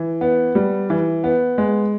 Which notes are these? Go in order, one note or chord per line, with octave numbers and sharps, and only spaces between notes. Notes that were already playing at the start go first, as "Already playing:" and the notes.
Already playing: E3
B3
G3
E3
B3
G#3